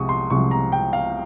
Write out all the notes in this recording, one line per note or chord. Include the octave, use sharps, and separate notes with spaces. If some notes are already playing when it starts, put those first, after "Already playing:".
Already playing: C2 C3 F3 G#3 C#6 D#6
C6
C2 C3 F3 G#3 C#6
A#5
G5
F5